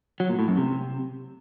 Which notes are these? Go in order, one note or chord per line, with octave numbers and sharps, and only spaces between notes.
F#3
A#2
A2
F#2
C3